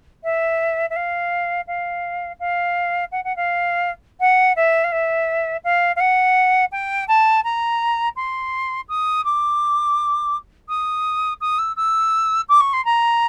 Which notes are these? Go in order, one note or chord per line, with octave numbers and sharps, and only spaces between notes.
E5
E5
F5
F5
F5
F#5
F#5
F5
F#5
E5
F5
E5
F5
F5
F#5
G5
A5
A#5
C6
D#6
D6
D#6
D#6
E6
E6
D6
C#6
C6
A#5